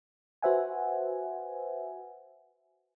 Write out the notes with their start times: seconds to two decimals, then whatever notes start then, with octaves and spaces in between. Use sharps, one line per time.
0.42 F#4 B4 C5 E5 F#5 G#5